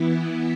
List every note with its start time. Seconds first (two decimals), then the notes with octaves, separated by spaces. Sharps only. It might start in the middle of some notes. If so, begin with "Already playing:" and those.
Already playing: E3 B3 E4